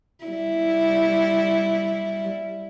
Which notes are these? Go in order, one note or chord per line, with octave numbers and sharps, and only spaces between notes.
G3 E4